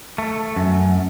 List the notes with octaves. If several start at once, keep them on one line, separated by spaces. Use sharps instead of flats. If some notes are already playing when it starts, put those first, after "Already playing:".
A3
F#2